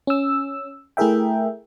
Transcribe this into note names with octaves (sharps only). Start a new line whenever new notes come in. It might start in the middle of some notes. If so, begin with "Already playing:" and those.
C#4 E6
A3 E4 G#4 A#4 E5 G5